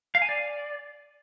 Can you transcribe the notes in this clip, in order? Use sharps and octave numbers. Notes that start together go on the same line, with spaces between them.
F5
G#5
D5